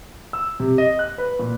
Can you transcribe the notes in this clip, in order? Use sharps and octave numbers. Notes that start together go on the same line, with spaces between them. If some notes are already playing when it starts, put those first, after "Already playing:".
E6
C3
D#5
F#6
B4
A#2